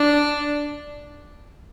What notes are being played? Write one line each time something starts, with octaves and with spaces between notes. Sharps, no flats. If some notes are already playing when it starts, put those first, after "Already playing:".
Already playing: D4